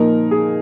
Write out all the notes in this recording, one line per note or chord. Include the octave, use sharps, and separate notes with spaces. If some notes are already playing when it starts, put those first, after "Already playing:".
Already playing: A#2 F3 A#3 D#4 A#4
G#4